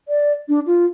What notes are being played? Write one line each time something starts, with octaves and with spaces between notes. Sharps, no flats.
D5
D4
F4